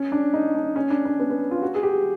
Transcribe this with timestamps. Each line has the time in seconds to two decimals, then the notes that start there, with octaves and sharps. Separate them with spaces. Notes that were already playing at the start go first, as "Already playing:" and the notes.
Already playing: C#4
0.12 D4
0.33 D#4
0.55 D4
0.76 C#4
0.90 D4
1.05 C#4
1.19 B3
1.30 B3
1.51 F4
1.62 F#4
1.75 G#4
1.83 G4